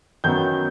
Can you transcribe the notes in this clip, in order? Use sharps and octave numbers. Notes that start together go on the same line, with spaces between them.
F#2 D#3 F#3 B3 G6